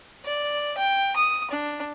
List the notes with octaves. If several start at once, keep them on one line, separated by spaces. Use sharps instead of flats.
D5
G5
D#6
D4